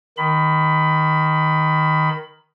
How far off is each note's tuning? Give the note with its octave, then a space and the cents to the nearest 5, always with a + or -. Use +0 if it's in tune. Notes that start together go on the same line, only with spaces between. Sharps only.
D#3 +0 B5 +20